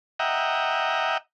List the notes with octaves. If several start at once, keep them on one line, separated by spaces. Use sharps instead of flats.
D#5 E5 F#5 G5 A#5